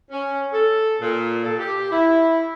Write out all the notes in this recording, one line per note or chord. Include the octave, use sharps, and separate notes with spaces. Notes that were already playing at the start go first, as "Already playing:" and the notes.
C#4
A4
A#2
A4
G4
E4